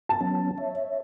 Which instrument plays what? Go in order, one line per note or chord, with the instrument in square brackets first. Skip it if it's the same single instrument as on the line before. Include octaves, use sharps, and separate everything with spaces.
[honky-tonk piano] A5
[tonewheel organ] F#3 B3 C#4
C#5 E5